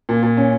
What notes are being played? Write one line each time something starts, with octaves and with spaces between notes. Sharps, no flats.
A#2
A#2
C#4